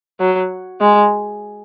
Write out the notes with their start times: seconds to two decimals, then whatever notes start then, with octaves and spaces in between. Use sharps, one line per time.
0.20 F#3
0.80 G#3